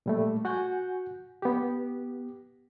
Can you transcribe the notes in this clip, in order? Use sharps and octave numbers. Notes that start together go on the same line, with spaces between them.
A#2 G3 A3
F#4 F#5 G#5 G6
B3 G4